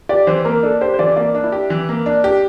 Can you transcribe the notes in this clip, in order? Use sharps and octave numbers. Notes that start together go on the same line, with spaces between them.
G4 D5
E3 C5
A#3 A#4
D4 A4
G4 C5
C5
E3 D5
A#3 D5
D4
E4
G4
E3
A#3
D4
G4